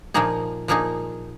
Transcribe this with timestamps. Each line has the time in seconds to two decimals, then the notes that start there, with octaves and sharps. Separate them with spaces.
0.14 A#2 F3 A#3 D#4 G#4
0.68 A#2 F3 A#3 D#4 G#4